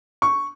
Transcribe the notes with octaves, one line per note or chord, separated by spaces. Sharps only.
C#6